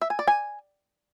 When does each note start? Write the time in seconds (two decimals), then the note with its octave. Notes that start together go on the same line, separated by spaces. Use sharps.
0.01 E5
0.10 G#5
0.19 D5
0.27 G#5